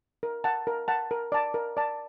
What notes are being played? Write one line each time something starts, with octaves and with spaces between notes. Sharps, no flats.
A#4
F#5 A5
A#4
F#5 A5
A#4
D5 A5
A#4
D5 A5